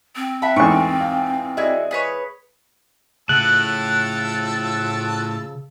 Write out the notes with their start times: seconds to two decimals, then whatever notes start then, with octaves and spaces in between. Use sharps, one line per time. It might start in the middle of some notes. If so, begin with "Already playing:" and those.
0.16 C4
0.42 E5 F#5 A5 B5
0.56 E2 G#2 A3 C#6 D7
1.00 F5 G5
1.57 E4 F#4 G#4 D5 D#5 G#6
1.91 G#4 B4 C#5
3.29 A2 C#3 F3 A5 E6 F#6